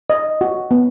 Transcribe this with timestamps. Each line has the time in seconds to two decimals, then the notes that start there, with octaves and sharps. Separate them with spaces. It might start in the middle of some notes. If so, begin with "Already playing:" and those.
0.10 D#5
0.41 F#4
0.71 B3